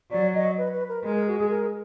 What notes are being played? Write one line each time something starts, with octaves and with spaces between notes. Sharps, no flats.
F#3 D5
D#5
B4
B4
A#4
G#3 A#4
A#4
F#4
G#4
A#4